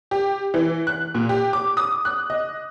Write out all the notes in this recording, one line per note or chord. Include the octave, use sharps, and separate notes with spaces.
G4
E3
F#6
A#2
G4
D6
D#6
F#6
D#5